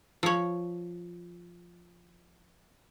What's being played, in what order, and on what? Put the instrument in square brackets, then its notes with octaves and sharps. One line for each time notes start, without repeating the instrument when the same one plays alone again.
[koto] F3 C#5